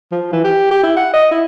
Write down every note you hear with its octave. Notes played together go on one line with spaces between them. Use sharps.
F3
E3
G4
G4
E4
F#5
D#5
E4